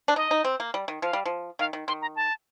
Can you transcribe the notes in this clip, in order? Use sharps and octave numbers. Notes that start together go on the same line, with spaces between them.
D4
D#4 D#5
D#4
C4
A#3
G3
D#3
F3 F5
G3
F3
D#3 F5
D#3
D#3 C6
A#5
A5